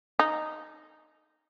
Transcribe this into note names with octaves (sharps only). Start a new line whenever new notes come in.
D#4